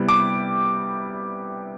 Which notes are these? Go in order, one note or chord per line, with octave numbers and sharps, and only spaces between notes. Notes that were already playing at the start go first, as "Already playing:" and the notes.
Already playing: C3 G3 B3 E4
D6